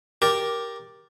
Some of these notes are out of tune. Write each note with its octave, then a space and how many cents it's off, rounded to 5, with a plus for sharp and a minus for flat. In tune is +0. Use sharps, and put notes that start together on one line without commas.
G4 +0 A#4 +10 D5 +0